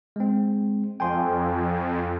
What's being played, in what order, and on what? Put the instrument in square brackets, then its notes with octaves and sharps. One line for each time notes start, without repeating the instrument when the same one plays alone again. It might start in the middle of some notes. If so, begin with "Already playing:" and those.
[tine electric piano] G#3 C4
[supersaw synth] F2 [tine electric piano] G5 G#5 C6